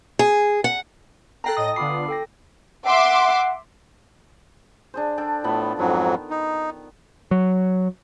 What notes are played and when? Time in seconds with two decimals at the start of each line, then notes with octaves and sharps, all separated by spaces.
0.19 G#4
0.64 F#5
1.44 A4 G5 A#5 F#6 A#6 C7
1.57 A2 D#5 D#6 A#6
1.76 D3 B3 F4 B5 D6 C7
2.08 A4 G5 A#6
2.86 E5 F#5 C6 D6
4.94 D4 G#4 C5
5.18 D4 A4 G5
5.44 A2 F3 B3 B5
5.79 F2 G#2 D#3 F#3
6.30 D#4
7.31 F#3